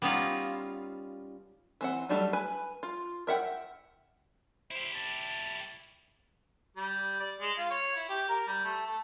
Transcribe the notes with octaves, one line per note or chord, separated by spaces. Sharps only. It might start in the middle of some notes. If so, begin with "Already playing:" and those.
G3 B3 C#4 D#4 F4
E3 C4 F#5
F#3 G3 A3 D4 D#4
B4 G#5
F4
A#4 E5 F#5 G5
E4 G4 C5
A5
G3
D5
G#3
F4
C#5
E4
G4
A#4
G3
A3
A4